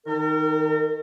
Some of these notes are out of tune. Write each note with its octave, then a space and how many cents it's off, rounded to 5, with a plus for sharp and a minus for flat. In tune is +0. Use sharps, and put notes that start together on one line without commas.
D#3 +0 A#4 -40